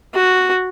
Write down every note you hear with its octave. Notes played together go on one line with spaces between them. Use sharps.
F#4